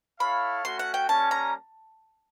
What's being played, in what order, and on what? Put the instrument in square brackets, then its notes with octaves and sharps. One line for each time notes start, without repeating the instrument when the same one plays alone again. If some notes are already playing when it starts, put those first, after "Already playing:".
[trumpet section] E4 A4 C#5 F5 [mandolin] B5
[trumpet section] A3 C#4 F#4 [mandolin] C6
[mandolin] F#5
G5
[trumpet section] G3 A#3 C#4 [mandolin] A5
[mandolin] A#5